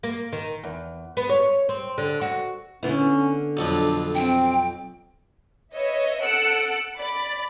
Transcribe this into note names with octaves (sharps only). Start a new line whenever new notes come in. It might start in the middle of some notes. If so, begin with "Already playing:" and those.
A#3
D#3
E2
B3
C#5
C4
D3
F#4
D3 B3 C#4 E4
B1 F2 F3 D4
C4 G5
B4 C#5 D#5 E5
A4 F#5 E6 F#6 C#7 D7
D5 B5 D6